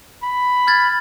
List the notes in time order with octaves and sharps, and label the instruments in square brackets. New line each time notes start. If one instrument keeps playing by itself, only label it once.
[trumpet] B5
[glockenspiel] F6 G#6 A6